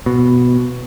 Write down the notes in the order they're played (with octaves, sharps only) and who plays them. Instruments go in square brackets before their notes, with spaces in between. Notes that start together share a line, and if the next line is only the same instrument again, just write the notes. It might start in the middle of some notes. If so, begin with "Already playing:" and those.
[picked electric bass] B2